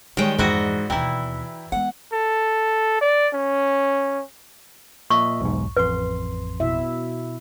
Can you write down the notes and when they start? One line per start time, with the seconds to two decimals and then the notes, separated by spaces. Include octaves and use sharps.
0.17 D#3 E3 G3 G#3 C#5 G5
0.38 F2 G#2 E3 E4 F#4 D5 D#5
0.90 D#2 B2 E3 E4 G5 A#5
1.72 G#3 B3 F#5
2.13 A4
3.01 D5
3.34 C#4
5.10 A#2 D#5 E5 C#6
5.41 B1 E2 G#2
5.77 A1 F2 B4 C6
6.60 B2 E4 E5